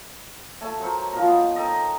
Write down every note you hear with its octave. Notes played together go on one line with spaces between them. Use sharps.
A3 G#5 A5
F#3 A#4 C5 C#6
D#3 F3 F4 A#4
B3
A4 D#5 G5 A#5